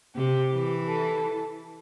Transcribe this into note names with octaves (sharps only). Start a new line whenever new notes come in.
C3 G4
E3
A4